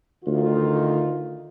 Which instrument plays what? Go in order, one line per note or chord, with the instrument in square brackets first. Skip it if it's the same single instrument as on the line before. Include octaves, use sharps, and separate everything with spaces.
[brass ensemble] D2 D#3 F4